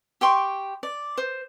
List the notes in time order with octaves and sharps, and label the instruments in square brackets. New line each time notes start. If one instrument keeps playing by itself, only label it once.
[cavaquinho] G4 G5 C6 C#6
D5
C5